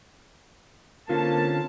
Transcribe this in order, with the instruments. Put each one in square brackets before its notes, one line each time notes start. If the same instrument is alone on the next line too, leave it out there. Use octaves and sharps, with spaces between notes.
[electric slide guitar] D3 C4 C#4 [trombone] A#3 [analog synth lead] F4 [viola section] A5